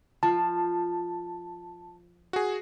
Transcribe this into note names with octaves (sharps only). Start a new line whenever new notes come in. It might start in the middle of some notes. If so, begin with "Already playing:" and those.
F3 A5
F#4 G#4